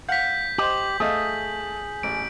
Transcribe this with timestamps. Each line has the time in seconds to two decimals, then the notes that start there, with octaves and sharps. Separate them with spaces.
0.09 F5 F#5 G6 B6
0.58 G4 C5 D#5 D6 F#7
1.00 A3 G#4 D#5 F5
2.03 A1 D7